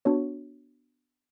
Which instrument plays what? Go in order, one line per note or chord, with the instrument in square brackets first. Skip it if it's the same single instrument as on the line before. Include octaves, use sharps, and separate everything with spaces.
[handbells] B3 D4 F#4 C#5